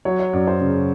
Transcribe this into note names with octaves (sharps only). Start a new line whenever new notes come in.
F#3 C#5
C#5
F#2 D5
C5
C#3